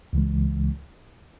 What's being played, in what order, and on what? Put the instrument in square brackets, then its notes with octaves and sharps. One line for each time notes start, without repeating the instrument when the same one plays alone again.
[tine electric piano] C#2 C#3 E3 G#3